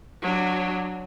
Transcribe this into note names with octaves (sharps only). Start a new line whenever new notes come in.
F#3 D4